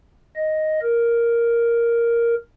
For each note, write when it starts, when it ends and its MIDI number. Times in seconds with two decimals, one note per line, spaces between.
0.36 0.80 75
0.83 2.35 70